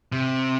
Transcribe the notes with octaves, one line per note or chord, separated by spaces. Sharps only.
C3